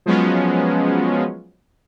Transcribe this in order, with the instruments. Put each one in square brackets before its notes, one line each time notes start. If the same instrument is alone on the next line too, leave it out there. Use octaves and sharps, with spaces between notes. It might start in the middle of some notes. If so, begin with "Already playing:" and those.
[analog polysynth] F3 F#3 G#3 B3 C#4